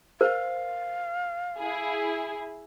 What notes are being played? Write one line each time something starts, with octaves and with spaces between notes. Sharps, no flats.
A#4 C5 F5
E4 G#4